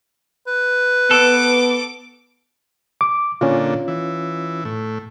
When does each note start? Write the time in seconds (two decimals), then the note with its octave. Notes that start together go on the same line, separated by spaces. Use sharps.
0.47 B4
1.11 B3 A4 D6
3.01 D6
3.41 A#2 D3 C#4 F4
3.88 E3
4.65 A2